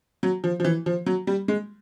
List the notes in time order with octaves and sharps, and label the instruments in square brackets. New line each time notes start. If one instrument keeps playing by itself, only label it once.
[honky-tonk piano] F#3
F3
F3
E3
F3
F#3
G3
G#3